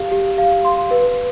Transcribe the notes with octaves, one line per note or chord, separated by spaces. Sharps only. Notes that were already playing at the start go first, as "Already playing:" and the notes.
Already playing: G4 F5
G4
F5
C6
B4